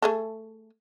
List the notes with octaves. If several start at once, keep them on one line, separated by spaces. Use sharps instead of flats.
A3 G#4 A4